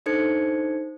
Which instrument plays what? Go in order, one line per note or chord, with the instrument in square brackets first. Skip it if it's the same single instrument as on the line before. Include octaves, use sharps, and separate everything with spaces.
[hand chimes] D4 D#4 A4 C5 G#6 C#7